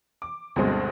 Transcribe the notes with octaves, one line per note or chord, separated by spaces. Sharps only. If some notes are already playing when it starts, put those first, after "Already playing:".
D6
D2 G2 B2 G#3 C4